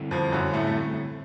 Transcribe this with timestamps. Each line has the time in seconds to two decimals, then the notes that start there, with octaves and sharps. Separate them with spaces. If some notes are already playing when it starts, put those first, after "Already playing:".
Already playing: D3 G3 C4 E4 A4
0.11 F2 F3
0.32 F#2 F#3
0.54 A2 A3
0.67 A3